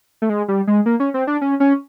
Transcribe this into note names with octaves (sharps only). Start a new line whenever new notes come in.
A3
G#3
G3
G#3
A#3
C#4
C4
D4
C#4
C#4